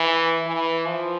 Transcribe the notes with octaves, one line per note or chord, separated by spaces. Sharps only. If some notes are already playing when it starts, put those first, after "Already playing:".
Already playing: E3
E3
F3